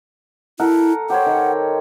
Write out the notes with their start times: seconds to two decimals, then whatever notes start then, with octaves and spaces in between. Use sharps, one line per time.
0.60 E4 A4 A#4 F#5
1.10 G4 C5 C#5 F#5
1.26 D#3